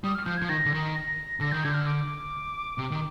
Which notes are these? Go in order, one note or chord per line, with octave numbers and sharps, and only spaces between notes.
G3 D#6
F6
F3 G6
F3 G#6
D#3 A#6
D3
D#3
A#6
D3 A#6
D#3 G6
D3 G#6
G6
F6
D6
C3
D#3